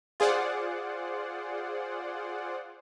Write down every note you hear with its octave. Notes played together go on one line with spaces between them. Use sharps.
F4 G#4 C5 D5 F#5